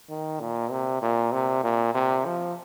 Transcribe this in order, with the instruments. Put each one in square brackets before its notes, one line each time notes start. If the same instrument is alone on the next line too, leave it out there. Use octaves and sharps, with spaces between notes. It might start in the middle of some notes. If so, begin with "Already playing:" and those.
[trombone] D#3
A#2
C3
A#2
C3
A#2
C3
F3